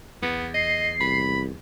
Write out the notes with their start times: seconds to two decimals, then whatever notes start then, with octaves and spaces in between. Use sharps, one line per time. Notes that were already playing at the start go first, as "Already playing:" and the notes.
0.22 E2 B3
0.54 D#5 C7
1.01 C2 B5